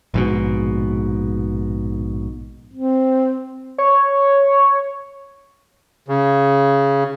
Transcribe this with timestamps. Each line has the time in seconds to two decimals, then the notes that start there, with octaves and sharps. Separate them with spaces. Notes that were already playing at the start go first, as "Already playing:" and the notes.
0.14 A#1 G#2 B2
2.74 C4
3.78 C#5
6.08 C#3